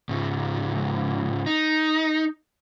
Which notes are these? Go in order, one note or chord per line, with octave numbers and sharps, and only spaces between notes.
C#2 G#2
D#4